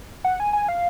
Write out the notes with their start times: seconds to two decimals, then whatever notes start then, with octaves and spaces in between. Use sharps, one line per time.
0.24 F#5
0.40 G#5
0.53 G#5
0.68 F5